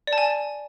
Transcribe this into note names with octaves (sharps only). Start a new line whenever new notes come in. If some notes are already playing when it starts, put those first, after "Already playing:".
D5
A5
G#5